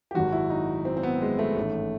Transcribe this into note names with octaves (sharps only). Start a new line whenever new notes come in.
G4
G#1 F#2 D#3 F#3 F#4
E4
D#4
C4
C4
B3
G#3
A3
A1 G#2 D#3